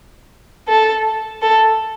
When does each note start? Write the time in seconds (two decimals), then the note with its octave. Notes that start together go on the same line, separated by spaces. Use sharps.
0.68 A4
1.42 A4